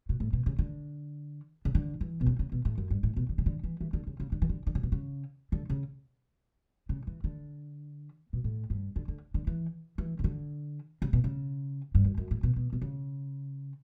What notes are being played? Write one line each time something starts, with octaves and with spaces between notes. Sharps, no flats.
B2
A2
B2
C#3
D3
C#3
D3
E3
B2
C#3
C#3
B2
A2
F#2
G2
A2
B2
D3
C#3
D3
E3
E3
D3
C#3
C#3
D3
E3
D3
D3
C#3
B2
C#3
D3
C#3
C#3
E3
D3
B2
A2
G2
D3
D3
D3
E3
E3
C#3
D3
C#3
B2
C#3
G2
F#2
F#2
A2
B2
B2
B2
C#3